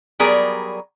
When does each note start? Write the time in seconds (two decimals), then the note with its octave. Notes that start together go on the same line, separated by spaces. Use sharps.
0.20 F#3 G3 B3 G#4 A#4 D5